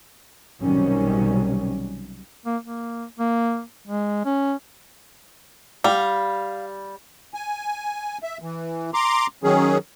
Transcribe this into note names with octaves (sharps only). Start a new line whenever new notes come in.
B1 C3 D#3 F#3 G3 C#4
A#3
A#3
A#3
G#3
C#4
G3 F5
G#5
E5
E3
A#5 C6 D6
D#3 F#3 C#4 G#4